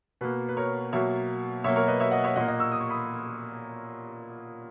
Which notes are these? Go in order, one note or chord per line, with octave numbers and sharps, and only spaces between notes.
B2 A#3 B4
B4
A#4 C#5
B2 F#3 A#3 C#5 E5
B2 F#3 A#3 C#5 E5
A#4 C#5
B4 D#5
C#5 E5
D#5 F#5
C#5 E5
A#2 A#3 D#5 F#5
D#5 F#5
C#6 E6
D#6
C#6
B5 D#6